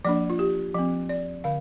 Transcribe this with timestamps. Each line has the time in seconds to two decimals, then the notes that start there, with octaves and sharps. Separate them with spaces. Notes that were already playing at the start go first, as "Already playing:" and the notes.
0.05 F3 A#3 D4 D5
0.30 F4
0.39 G4
0.74 F3 C4
1.09 D5
1.44 D3 F5